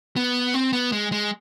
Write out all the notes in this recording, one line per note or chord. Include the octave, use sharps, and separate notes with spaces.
B3
C4
B3
G#3
G#3